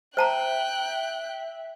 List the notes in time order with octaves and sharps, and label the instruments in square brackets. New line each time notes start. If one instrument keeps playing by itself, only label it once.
[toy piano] C5 A5 A#5 [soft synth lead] E5 [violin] G5 F#6